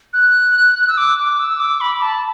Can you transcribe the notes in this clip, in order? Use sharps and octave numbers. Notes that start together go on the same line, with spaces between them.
F#6
E6
D6
D6
E6
D6
B5
A5